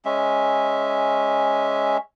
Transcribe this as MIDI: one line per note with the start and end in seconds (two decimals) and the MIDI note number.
0.05 1.97 56
0.05 1.97 61
0.05 1.97 76